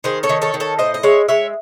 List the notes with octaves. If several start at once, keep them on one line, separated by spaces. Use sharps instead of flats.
D#3 G#4 C5
A4 C#5
D#3
A4 C#5
D#3
A4 C#5
A2 C5 D#5
D#5
G#3 C#5 E5
G#3 C#5 E5